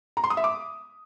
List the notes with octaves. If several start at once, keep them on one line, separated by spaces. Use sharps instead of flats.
A#5
C6
D#6
E5
D6